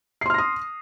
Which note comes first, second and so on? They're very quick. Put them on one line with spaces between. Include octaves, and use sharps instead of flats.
C7 C6 F6 A#6 D#6